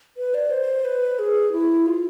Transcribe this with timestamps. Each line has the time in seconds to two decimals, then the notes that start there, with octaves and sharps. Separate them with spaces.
0.17 B4
0.34 D5
0.50 C5
0.85 B4
1.19 G#4
1.52 E4
1.86 F4